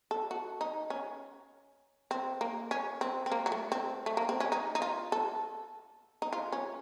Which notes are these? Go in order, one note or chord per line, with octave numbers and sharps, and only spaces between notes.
A4
F#4
D#4
C#4
C4
A#3
C#4
C4
C4
A#3
F#3
A3
C4
A3
A#3
C4
C#4
D#4
D#4
F4
A4
D#4
F4
C#4